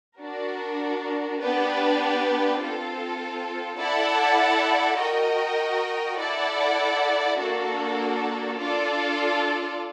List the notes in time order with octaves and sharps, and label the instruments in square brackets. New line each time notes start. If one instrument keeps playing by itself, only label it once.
[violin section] D4 F#4 A#4
B3 D4 G4 B4
C4 F4 A4
E4 A4 D5 F#5 A5
F#4 A#4 D#5 G5
E4 A4 D5 F#5
A#3 D4 F#4 A4
D4 F4 A4 D5